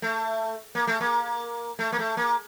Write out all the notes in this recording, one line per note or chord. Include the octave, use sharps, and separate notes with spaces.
A3
A#3
A3
A#3
A3
A#3
A3
A#3